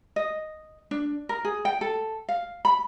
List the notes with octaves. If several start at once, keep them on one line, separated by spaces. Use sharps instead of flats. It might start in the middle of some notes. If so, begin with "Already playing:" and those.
D#5
D4
A#4
G#4
G5
A4
F5
B5